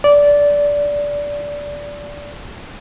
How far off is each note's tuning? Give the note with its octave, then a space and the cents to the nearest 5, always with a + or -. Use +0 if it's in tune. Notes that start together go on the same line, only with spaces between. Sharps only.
D5 -15